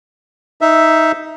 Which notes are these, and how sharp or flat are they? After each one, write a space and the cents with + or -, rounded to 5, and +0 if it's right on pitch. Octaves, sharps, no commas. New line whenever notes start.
D#4 +10 E5 +0